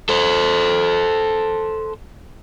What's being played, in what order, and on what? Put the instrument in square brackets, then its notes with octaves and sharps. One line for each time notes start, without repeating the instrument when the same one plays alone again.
[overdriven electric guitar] A4 C5